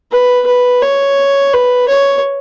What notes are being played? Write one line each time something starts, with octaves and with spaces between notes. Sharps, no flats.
B4
B4
C#5
B4
C#5